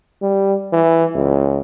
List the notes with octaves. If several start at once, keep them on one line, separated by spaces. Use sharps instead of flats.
G3
E3
C#2